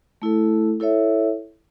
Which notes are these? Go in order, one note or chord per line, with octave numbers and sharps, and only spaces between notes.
A3 E4 A4
E4 A4 C#5 E5